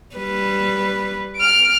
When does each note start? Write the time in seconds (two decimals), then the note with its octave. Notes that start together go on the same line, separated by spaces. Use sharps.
0.15 G3 B4
1.37 F6 D7